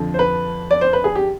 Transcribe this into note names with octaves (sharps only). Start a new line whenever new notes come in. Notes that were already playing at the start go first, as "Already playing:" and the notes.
Already playing: F2 D3 F3
C5
B4
D5
C5
B4
G#4
G4